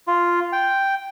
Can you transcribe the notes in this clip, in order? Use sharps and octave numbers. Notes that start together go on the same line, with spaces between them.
F4
G5